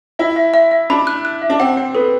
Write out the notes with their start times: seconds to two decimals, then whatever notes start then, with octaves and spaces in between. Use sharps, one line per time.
0.19 E4 E5
0.36 E5
0.54 E5
0.71 E5
0.90 D4 B5
1.07 F#6
1.25 F#6
1.42 E5
1.50 D4
1.60 C4 F#5
1.77 C4 F#5
1.95 B3 A4